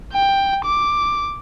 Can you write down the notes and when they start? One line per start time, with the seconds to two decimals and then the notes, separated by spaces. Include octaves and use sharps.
0.13 G5
0.65 D6